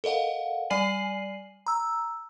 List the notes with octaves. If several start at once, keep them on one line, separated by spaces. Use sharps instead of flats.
A4 A#4 D#5 F5 F#5
G3 D5 G#5 C7 D#7 F#7
A#5 E6